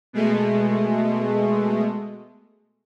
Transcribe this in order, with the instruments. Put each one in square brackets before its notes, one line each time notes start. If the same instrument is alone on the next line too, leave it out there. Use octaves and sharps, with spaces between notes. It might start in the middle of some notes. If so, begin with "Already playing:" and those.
[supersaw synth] B2 G#3 A3